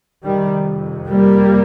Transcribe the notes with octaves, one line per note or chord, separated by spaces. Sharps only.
F2 C3 D#3 G3
G3 A#3